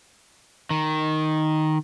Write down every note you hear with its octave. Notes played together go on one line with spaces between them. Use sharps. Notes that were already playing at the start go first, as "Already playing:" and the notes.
D#3